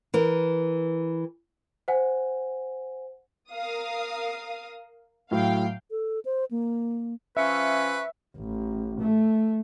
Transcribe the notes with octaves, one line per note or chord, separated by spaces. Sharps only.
E3 A#4
C5 F#5 G#5
A#4 F5 D#6
A2 F#3 F5 G5
A4
C5
A#3
F3 C#4 B4 E5 C#6
A1
A3